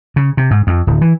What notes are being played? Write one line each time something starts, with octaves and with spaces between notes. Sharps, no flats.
C#3
C3
G#2
F2
D1
E3